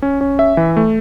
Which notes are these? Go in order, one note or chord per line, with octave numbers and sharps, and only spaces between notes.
C#4
C#4
E5
E3
A3